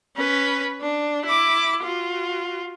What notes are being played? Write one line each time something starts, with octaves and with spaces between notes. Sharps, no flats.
C#4 B4
D4
E4 D6
F4 F#4